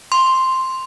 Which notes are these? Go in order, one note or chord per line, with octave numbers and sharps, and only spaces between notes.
C6